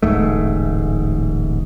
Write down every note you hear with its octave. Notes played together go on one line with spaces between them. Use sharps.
D1 A1 G#2 A3